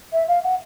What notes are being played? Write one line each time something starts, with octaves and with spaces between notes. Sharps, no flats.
E5
F5
F#5